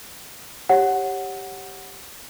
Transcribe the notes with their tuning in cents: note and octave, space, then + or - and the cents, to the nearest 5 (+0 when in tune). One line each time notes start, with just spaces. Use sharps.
G4 +0 C#5 -20 F#5 +0